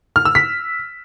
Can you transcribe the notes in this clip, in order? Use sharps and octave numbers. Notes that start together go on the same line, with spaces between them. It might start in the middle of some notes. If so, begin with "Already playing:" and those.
F6
E6
B6